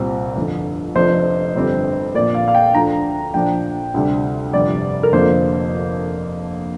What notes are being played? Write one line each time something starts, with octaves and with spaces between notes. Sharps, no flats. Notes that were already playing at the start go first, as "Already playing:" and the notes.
Already playing: C2 A#2 G3 C4
G1 F2 D3
F1 F2 F3 D4 C5
G1 F2 D3 G3 C4
A#1 A#2 A#3 D5
F5
F5
G5
D2 D3 F3 D4 A#5
A#1 A#2 F3 D4 G5
D2 C3 G3 D4
G1 F2 C3 G3 D5
A#4
F1 F2 D3 A#3 C5